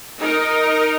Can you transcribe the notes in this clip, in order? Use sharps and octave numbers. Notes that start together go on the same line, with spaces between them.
D#4 A#4 D#5